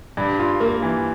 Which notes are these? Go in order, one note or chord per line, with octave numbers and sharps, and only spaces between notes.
G2
F4
A#3
E3